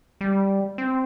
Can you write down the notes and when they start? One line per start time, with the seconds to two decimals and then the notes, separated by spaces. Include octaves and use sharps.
0.21 G3
0.78 C4